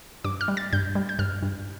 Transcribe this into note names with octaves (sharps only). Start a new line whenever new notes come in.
G2 D6
F6
G3
A6
G2 G6
G3
G6
G2 F6
G2